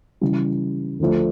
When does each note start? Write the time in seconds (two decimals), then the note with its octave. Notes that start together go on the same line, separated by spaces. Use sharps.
0.21 C#3 E3 G3
0.99 D2 D3 F3 A3 D4